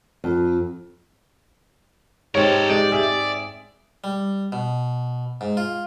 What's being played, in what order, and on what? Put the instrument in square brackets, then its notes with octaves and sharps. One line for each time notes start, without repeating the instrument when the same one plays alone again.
[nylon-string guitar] F2
[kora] G#2 C4 [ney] G4 [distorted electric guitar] A4 A#4 [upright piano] C#5
[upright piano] G#3 [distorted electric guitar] D5
[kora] G#4 [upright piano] E5
[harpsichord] G3
B2
G#2
F4